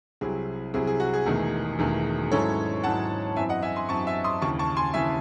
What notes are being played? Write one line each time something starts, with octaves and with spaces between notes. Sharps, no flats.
C2 C3 F#3 C4 E4 G#4
C2 C3 F#3 C4 E4 G#4
G#4
F#4
G#4
E1 E2 D#3 A3
E1 E2 D#3 A3
G#2 F#3 C#4 E4 A4 C#5
G#2 F#3 C#4 E4 F#5 A5
F#2 E3 C4 E5 G#5
D#5 F#5
E5 G#5
G#5 C6
F#2 E3 C4 A5 C#6
E5 G#5
C6 D#6
D#2 C#3 E3 A5 C#6
A5 C#6
G#5 C6
D#2 C#3 E3 E5 G#5